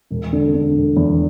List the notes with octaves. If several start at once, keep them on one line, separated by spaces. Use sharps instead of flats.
E1
D3
D3
E1
E2